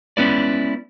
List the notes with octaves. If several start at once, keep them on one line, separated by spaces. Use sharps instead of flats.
G#3 B3 C#4 E4 B4 D5